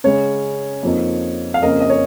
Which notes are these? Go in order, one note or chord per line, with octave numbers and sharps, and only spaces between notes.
C#3 G#3 C#4 C#5
F2 F3 A#3 D#4
F5
F2 C#3 A#3 C#4 A#4 D#5
D#5
C#5